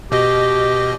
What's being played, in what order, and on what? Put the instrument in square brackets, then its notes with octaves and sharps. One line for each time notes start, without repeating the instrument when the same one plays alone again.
[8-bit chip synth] B2 D#5 [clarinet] G4